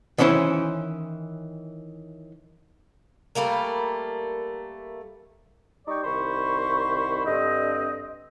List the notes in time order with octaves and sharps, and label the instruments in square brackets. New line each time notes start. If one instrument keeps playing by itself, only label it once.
[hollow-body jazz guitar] D#3 E3 C#4 E4 C5
[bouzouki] G3 A3 A#3 A#4
[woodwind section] G3 D#4 D5 G5 C#6
C2 D#3 C5 B5 C#6
G2 D3 C4 D#5